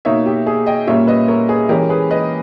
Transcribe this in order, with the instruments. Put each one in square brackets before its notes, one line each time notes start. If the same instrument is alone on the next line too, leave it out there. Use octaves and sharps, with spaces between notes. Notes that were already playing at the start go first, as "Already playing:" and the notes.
[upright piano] B2 A#3 D#4 C#5 E5
G4
G#4
D#5 G5
A#2 G3 A#3 C#4 C#5 E5
B4 D#5
A#4 C#5
G#4 B4
E3 G#3 C#4 G4 A#4
G#4 B4
B4 D#5